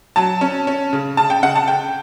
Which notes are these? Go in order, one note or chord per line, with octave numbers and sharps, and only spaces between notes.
F#3 A5
C#4
C#4
C#3
C#3 A5
G5
C#3 F#5
A5
C#3 G5